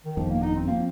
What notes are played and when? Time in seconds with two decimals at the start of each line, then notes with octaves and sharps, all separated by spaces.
0.05 D#3
0.17 G1 F2 D#3 F3
0.30 A#3
0.42 D#4
0.55 C4
0.67 F3 A#3 C4